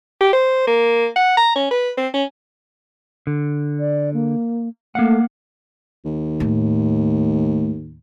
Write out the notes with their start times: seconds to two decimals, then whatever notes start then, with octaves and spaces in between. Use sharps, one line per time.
0.21 G4
0.33 C5
0.67 A#3
1.16 F#5
1.37 A#5
1.56 C#4
1.71 B4
1.97 C4
2.14 C#4
3.27 D3
3.80 D5
4.14 A#3
4.95 A3 A#3 F5 F#5
6.05 D#2
6.40 A2